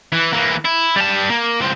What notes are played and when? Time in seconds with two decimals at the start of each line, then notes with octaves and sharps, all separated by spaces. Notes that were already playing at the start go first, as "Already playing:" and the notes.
0.12 E3
0.33 E3 A#3
0.65 E4
0.96 G3 A5
1.29 A#3
1.60 C#2 C4